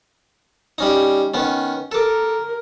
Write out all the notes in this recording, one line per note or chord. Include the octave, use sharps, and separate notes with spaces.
G3 C#4 D#4
D#3 B3 C#4
A4 A#4 D6